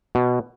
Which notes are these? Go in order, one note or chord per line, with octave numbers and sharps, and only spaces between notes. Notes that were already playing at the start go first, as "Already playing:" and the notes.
B2